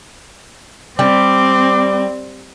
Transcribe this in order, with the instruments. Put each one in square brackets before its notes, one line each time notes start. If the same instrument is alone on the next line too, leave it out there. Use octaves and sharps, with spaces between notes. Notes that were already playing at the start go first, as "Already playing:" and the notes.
[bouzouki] G3 [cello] C4 [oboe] D6